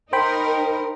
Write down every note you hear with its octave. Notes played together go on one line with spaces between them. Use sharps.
D#4 A#4 C5 G5 B5